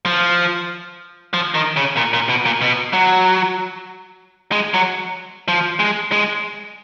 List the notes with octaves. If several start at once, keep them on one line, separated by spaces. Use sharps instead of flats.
F3
F3
D#3
C#3
A#2
A#2
B2
A#2
B2
F#3
G#3
F#3
F3
G#3
G#3